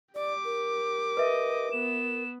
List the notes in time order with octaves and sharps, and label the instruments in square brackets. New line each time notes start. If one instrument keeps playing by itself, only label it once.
[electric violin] G4 D6 [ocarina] D5
[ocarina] A#4
[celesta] B4 E5 [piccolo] D#5
[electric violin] B3 [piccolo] E7